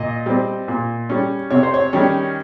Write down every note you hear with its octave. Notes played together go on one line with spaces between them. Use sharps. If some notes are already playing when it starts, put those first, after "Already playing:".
Already playing: A#2 D#5
G3 C4
A#2
G3 C#4
C3 C#5
C5
C#5
D#3 G3 C#4